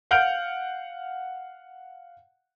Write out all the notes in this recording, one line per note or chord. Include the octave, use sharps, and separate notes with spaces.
F5 F#5 F6 G6 D7